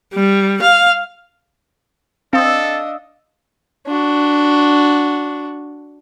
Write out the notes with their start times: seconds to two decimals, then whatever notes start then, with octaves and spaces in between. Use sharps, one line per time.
0.14 G3
0.62 F5
2.33 C4 D4 A4 D#5 F5 D#6 E6
3.87 D4 F#4